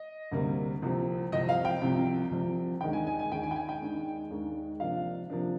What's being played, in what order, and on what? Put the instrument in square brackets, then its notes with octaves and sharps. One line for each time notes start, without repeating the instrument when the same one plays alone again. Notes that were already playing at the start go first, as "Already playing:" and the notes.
Already playing: [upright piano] D#5
D2 C3 G3 A#3
C2 C3 F3 C4
C2 C3 F3 C4 D#5
F5
G5
C2 C3 F3 C4
C2 C3 F3 C4
D#2 D#3 G#3 D4 G5
G#5
G#5
G#5
D#2 D#3 G#3 D4 G5
G#5
G5
G#5
G5
D#2 D#3 G#3 D4
D#2 D#3 G#3 D4
C3 F3 A#3 D4 F5
C3 F3 A#3 D4